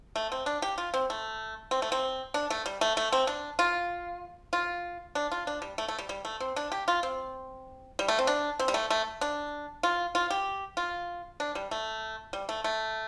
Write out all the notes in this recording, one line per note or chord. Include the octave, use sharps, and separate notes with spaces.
A3
C4
D4
G4
F4
C4
A3
C4
A3
C4
D4
A3
G3
A3
A3
C4
D4
F4
F4
D4
F4
D4
G3
A3
A3
G3
G3
A3
C4
D4
G4
F4
C4
G3
A3
C4
D4
C4
G3
A3
A3
D4
F4
F4
G4
F4
D4
G3
A3
G3
A3
A3